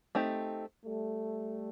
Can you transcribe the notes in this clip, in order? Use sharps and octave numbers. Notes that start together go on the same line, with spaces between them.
A3 C4 D#4 G4
G3 A3